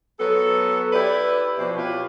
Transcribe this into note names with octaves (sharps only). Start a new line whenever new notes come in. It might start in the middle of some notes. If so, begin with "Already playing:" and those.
F#3 B3 A4
E4 G4 B4 D5 E5
B2 F3 C4 E4 G4
E4 F4 G4 B4 C#5